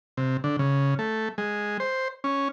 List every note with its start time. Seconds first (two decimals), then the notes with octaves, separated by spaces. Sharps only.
0.17 C3
0.44 D3
0.59 C#3
0.99 A3
1.38 G#3
1.80 C5
2.24 C#4